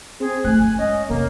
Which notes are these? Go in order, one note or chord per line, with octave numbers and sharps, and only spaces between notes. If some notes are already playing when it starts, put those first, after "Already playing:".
C4 G#4
A3 C4 G#5 F#6
F#2 G#5
G#3 C#4 D#5
F1 C#3 A#3